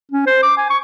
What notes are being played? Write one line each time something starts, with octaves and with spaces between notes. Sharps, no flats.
C#4
C5
D6
G#5
C#6